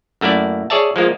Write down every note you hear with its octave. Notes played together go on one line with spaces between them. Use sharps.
F#2 A3 A#3 E4 D5
G#4 C#5 D5 E5 A5
F3 G#3 A#3 F4